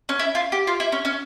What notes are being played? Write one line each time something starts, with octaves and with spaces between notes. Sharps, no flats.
C#4
E4
F4
G4
F4
E4
C#4
C#4